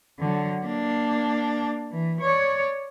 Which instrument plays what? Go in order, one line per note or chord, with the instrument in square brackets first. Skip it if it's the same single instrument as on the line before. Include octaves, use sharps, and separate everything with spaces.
[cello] D3 F#3
A#3 D4
E3
C#5 D5